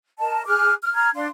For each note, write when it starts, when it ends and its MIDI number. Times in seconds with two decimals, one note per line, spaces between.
0.19 0.42 70
0.19 0.42 75
0.19 0.42 81
0.46 0.73 68
0.46 0.73 86
0.46 0.73 89
0.46 0.73 90
0.82 0.92 89
0.94 1.09 82
0.94 1.09 89
0.94 1.09 92
1.13 1.27 62
1.13 1.27 77
1.13 1.27 84